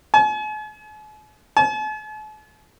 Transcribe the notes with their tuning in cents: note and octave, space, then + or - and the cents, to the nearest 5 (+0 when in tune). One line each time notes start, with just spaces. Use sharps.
G#5 +45
A5 -45